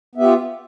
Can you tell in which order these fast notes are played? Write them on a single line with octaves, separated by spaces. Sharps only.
B3 E5 G4 F4